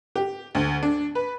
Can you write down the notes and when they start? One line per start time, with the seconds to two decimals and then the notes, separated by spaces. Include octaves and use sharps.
0.16 G4
0.55 D2
0.83 D4
1.15 B4